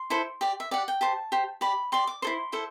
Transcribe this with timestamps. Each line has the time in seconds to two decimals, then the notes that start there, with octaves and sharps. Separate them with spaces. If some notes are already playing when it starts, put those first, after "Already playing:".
Already playing: C6
0.10 E4 A4 C5
0.41 G4 D5
0.60 E5
0.71 G4 D5 F#5
0.88 G5
1.01 G4 C5 A5
1.32 G4 C5
1.61 G4 D5 B5
1.92 G4 D5 C6
2.07 D6
2.22 E4 A4 C5 C6
2.52 E4 A4 C5